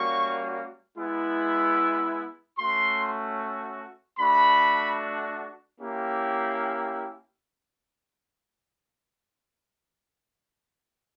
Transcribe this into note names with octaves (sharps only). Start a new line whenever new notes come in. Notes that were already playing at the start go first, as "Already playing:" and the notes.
Already playing: G3 A#3 C#4 F#4 C#6
G#3 B3 E4
A3 C#4 F#4 C6
A3 D4 F#4 B5
A#3 C#4 E4 G4